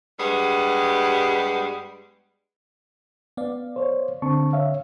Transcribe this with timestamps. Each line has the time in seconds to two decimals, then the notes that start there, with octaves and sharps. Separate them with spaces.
0.18 G2 G3 G#3 B3
3.37 B3 D5 F5
3.76 C5 C#5
4.22 D3 C4 A5 C#6
4.53 C#5 E5 F5